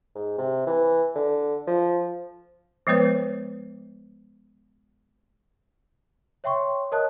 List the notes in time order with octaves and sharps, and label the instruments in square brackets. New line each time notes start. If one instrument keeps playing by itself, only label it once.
[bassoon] G#2
C3
E3
D3
F3
[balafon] F3 G#3 B3 B4 C#5
[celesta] C#5 E5 G5 C6 C#6
A#4 C#5 D#5 A5 D#6 F#6